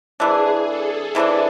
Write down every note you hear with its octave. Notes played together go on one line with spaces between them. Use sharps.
C3 E3 A3 D4 G#4
A4
C3 E3 A3 D4